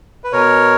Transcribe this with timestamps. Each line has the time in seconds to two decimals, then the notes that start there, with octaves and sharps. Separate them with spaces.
0.24 B4
0.33 B2 A#4 C#5